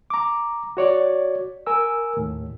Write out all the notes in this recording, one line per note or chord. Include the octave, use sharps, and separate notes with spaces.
A#5 D6
F#4 C#5 D5
A#4 G#5 E6
D#2 A2